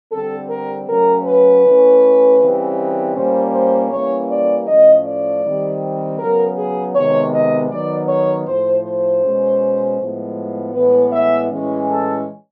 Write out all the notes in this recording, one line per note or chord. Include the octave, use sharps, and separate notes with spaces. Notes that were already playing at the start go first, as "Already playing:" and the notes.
D3 G3 C4 A4
A#4
C#3 F#3 A3 C#4 A#4
B4
E3 A3 C#4
C#3 E3 G3 C4
A#2 G3 A#3 C#4 C5
C5
E3 G3 A#3 C#4 C#5
D5
A2 F3 A3 C#4 D#5
D5
D#3 G3 C4
C#3 F#3 B3 A#4
G#4
C3 D#3 G#3 B3 C#5
D#5
D#3 F#3 B3 D5
C#5
A2 F3 A3 C5
C5
B2 G#3 C#4
A2 F3 G#3 B3
A2 E3 G#3 B3 B4
E5
A2 E3 G#3 C#4
A4